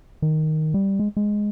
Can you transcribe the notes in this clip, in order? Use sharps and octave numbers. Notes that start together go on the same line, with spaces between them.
D#3
G3
G#3
G#3